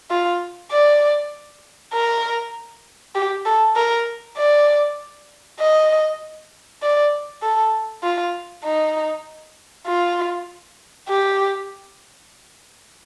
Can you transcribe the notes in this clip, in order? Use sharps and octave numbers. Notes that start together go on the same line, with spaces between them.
F4
D5
A#4
G4
A4
A#4
D5
D#5
D5
A4
F4
D#4
F4
G4